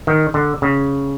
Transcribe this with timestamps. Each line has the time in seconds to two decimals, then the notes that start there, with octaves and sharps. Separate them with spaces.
0.07 D#3
0.34 D3
0.62 C#3